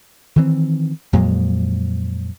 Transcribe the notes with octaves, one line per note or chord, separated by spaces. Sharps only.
D#3 E3 C4
F2 A#2 F#3 G#3